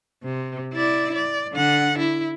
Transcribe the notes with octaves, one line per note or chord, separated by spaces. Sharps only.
C3
E4 D5
D5
D3 F#5
E4